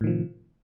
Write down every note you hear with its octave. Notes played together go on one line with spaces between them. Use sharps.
A2 C3 D#3 F3